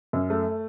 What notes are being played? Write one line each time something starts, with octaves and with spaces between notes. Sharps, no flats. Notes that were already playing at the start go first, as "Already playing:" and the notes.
F#2
A3